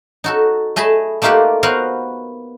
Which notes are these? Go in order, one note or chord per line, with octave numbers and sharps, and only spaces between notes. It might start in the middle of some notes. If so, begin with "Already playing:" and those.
D#4 F#4 A4
A3 G#4 D#5 A5 B5
A3 A#3 D#4 F4 G4 F#5
B3 F#4 A#4 C5 F5 F#5